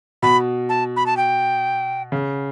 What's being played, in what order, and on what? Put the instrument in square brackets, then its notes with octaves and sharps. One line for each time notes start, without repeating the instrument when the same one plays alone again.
[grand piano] B2 [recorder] B5
[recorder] A5
B5
A5
G5
[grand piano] C#3